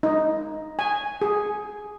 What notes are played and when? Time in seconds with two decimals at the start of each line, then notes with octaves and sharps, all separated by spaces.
0.03 D#4
0.79 G#5
1.22 G#4